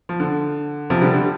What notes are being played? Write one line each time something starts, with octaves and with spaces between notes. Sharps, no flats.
F3
D3
C3 F3
D3 G3
D3 G3